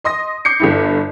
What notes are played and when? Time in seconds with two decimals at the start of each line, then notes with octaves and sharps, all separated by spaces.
0.04 D#5 C6 D#6 A#6
0.45 D6 G6 C7 C#7
0.60 G1 G2 E4